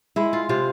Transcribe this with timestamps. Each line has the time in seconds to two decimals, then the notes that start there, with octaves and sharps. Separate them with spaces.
0.16 G#3 E4
0.33 F4
0.49 C3 F4